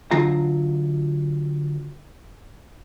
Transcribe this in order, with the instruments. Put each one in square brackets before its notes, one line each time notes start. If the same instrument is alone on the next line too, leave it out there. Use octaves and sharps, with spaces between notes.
[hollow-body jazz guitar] D3 F#3 F4 A#5